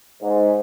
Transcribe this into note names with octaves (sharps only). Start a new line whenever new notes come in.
G#2